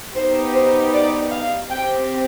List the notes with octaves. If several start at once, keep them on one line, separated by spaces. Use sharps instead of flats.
B3 D#4 G4 C5
C5
D5
F5
C4 G4 G5